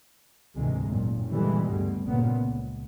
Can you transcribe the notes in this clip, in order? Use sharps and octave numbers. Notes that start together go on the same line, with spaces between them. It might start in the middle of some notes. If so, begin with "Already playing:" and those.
D2 G#2 C3 E3 G#3
F#1 A#2
A#2 D3 E3 G3 G#3
D2 G2 B2
G1 A#2 C#3 B3
C#2